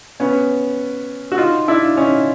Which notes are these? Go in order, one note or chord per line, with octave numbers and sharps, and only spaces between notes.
B3 C#4
F#4
D#4 F4
D4 E4
C#4 D#4